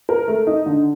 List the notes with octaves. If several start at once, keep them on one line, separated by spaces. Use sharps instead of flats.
A#4
A3
D#4
D3